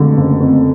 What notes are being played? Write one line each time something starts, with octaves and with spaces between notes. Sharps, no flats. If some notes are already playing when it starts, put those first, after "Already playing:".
Already playing: F2 D3 G#3
F#1
F2